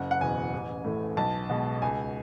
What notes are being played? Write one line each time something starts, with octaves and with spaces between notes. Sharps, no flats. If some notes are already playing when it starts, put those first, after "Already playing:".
Already playing: F#1 F#5
F#5
E2 B2 G#5
A1
A2 E3 A3
B1 A5
B2 G#3
C#2 G#5